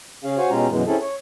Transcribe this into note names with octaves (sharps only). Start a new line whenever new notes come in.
C#3 C#4 G#4 F5
F#4 C5 C#5 F5 G#5
B2 G#3 C#4 F4 G4 A#5
F#2 B2 E3 G#3
C4 C#4 E4 G#4 A4
C#5